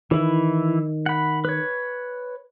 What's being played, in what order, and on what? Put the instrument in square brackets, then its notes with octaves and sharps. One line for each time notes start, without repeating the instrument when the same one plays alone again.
[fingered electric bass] D#3 [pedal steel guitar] E3 E4
[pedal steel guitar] F#5 B5
B4 C#5